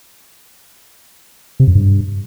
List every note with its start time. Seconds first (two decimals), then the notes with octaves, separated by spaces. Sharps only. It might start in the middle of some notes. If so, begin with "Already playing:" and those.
1.60 C3
1.67 F#2
1.75 G2